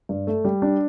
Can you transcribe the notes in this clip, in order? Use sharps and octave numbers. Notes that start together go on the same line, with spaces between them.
G2
A3
G3
D4